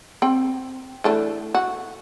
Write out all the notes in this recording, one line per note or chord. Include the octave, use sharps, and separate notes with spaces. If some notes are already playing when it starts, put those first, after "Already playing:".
C4 G5
E3 A3 D4
F#4